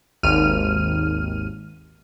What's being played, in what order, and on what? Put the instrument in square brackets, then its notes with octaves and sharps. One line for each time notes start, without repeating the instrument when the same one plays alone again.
[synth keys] G#1 D#2 F6 D#7